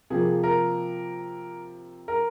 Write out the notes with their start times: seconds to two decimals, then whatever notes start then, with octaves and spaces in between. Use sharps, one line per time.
0.10 C3 F3 A#3 G#4
0.43 A#4
2.08 A#4